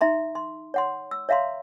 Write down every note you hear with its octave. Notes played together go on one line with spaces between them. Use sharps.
D#4 E5 A#5 C6
C6
C#5 F#5 C6
E6
C#5 E5 F5 A#5 C6